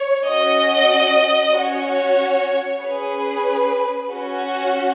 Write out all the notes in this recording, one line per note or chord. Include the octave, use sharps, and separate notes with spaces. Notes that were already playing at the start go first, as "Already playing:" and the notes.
Already playing: C#5
C#4 F#4 D#5
C#4 F#4 C#5
C#4 G#4 B4
C#4 F#4